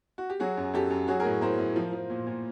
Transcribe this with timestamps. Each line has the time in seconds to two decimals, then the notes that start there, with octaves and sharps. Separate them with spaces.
0.18 F#4
0.30 G4
0.40 F#3 F#4 G#4
0.57 F#2
0.73 F#2 G4 A4
0.91 F#2
1.08 F#3 F#4 G#4
1.20 G#4 A#4
1.25 A2
1.41 A2 A#4 C5
1.58 A2
1.76 F3
1.93 F3
2.10 A#2
2.27 A#2